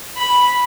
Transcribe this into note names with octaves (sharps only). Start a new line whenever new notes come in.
B5